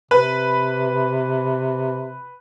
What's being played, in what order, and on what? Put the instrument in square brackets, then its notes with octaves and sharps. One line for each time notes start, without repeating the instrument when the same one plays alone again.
[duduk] C3 [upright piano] B4